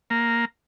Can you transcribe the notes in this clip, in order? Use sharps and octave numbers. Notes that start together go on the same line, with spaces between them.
A#3